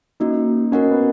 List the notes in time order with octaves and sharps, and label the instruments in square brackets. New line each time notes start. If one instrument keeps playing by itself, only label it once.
[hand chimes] A#3 C#4 F#4 [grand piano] D#4
[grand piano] C#4 [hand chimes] F#4 A#4 D#5 F#5
[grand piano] B3